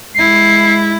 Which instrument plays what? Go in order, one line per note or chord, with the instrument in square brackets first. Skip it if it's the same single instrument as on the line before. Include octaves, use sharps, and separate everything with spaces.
[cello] G#3 E4 [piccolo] C7